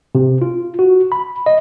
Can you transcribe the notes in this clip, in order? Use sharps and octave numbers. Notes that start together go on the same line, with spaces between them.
C3
F4
F#4
B5
D#5